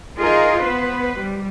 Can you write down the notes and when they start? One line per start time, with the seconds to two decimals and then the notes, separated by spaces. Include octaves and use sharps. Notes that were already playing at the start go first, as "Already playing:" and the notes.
0.19 D#4 F4 G#4 A#4
0.61 B3 B4 C5
1.16 G3